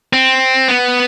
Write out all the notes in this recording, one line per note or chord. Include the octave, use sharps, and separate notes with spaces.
C4
B3